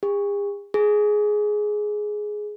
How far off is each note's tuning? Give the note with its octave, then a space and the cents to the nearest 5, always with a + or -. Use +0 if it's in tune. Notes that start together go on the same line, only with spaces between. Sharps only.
G#4 -45
G#4 +10